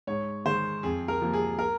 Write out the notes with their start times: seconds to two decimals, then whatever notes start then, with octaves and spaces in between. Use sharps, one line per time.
0.07 G#2 C#5
0.45 D#3 G#3 C5
0.83 F2 G#4
1.08 A#4
1.21 C3 F3 A#3
1.33 G#4
1.59 A#4